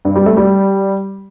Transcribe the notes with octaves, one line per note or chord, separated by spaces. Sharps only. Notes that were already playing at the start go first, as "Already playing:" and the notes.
G2
G3
A3
G3